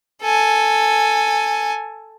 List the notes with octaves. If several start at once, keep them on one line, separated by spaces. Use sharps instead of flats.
A4 G#5